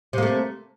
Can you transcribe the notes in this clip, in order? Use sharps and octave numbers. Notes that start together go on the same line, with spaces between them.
C3 A3 A#3